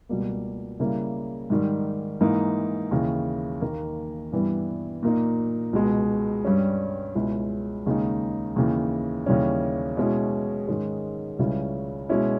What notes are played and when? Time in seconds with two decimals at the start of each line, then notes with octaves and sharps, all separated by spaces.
0.09 C#2 B2 G3 A#3
0.80 C#3 G3 A#3 E4
1.50 G#2 D#3 G3
2.21 G#2 E3 A#3 D#4
2.91 D#2 C#3 E3
3.62 D#2 D#3 A#3
4.32 G2 E3 G3 B3
5.03 A#2 A#3 D#4
5.73 C#2 B2 G#3
6.45 G2 G3 C#4
7.15 C#2 B2 G#3 C#4 E4
7.86 D#2 C#3 G#3 D#4
8.56 D#2 C#3 E3
9.26 D#2 C#3 E3 G3 C#4
9.97 B2 G#3 C#4 E4
10.68 G#2 D#3 G#3 C#4
11.39 C#2 C#3 G3 C#4 E4
12.09 B2 G#3 C#4 E4